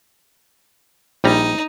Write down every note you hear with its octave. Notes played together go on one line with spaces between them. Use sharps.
A#1 G3 D#4 A#5